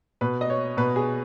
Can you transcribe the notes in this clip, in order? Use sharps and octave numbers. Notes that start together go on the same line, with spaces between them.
B2 B4
D#5
C#5
B2 B4
G#4